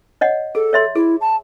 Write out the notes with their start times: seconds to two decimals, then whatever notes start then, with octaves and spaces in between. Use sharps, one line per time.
0.21 C#5 D#5 F#5
0.55 G#4 A4
0.73 C#5 E5 C6
0.96 E4 G#4
1.21 A5